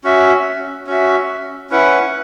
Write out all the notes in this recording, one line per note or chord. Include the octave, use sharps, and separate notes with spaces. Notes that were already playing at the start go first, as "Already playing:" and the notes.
C#4 F#4 E5
C#4 F#4 E5
C#4 E4 B4 F#5